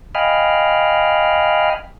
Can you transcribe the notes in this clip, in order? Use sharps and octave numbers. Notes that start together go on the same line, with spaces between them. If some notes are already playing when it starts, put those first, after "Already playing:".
D#5 F5 G5 G#5 B5 F6